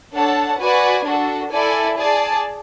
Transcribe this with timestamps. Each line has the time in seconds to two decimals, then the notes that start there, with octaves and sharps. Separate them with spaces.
0.13 D4 A4 C#5 F#5 A5
0.59 F#4 B4 D5 G#5
1.05 D4 F#4 A4
1.51 E4 A4 D5 G#5
1.98 G#4 D5 A5